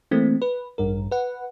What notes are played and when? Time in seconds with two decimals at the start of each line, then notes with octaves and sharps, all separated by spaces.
0.11 E3 A3 A#3 C4
0.42 B4
0.78 A1 G2 A#4
1.11 B4 F#5